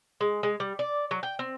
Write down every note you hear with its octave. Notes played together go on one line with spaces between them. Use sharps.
G#3
G#3
G3
D5
F#3
G5
C4